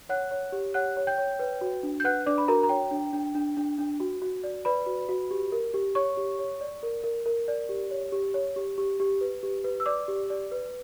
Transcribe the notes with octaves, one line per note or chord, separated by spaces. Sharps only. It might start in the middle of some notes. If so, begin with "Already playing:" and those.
C#5 F#5 F#6
C#5
G4
C#5 F#5 F#6
C#5
G5 G6
C#5
B4
F#4
D4
G6
B4 F#5 F#6
D4 D5 D6
B5
F#4 A#4 A#5
A#5
C#5 G5
D4
D4
D4
D4
D4
F#4
F#4
D5
B4 D5 B5
F#4
F#4
G4
A#4
G4
C#5 C#6
G4
C#5
D5
A#4
A#4
A#4
D5
G4
C#5
G4
C#5
G4
G4
G4
B4
G4
B4
E6
D5 D6
G4
D5
B4